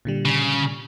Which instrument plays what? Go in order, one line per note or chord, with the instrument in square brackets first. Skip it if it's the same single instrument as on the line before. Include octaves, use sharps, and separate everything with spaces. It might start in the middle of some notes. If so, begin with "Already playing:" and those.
[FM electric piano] A#2 D3 G3
[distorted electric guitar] C#3